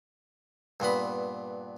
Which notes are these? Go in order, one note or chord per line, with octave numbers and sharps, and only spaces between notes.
G2 A#2 B3 B5